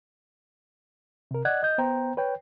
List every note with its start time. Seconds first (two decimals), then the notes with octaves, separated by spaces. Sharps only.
1.31 C3 A#4
1.45 D5 D#5 F#5 F#6 G#6
1.63 D#5 G6
1.78 B3 C5 G5 A#5
2.17 B4 C#5 G5